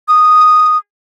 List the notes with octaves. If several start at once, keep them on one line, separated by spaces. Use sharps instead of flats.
D#6